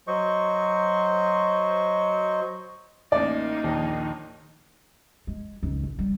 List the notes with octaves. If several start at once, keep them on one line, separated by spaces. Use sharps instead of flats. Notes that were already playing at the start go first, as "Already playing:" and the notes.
F#3 C5 D#5 C#6
A1 A#3 D#4 D5
A#1 D#2
G#3
C#2 D#3
A1
G3